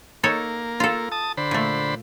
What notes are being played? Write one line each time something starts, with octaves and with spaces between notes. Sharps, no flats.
A#3 D#4 A4 C#5
F4 A4
A5 D#6
D3 C5 B5
A#2 A3